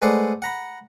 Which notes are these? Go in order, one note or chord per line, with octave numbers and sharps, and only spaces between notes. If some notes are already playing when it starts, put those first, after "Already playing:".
G#3 A3 B4 C5 D5 F#5
F#5 A#5 B5